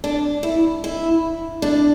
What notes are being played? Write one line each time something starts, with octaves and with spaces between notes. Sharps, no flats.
D4
E4
E4
D4